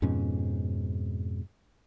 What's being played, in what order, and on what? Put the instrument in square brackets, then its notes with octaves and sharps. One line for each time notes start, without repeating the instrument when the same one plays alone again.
[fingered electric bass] F2 G#2 B2 C#4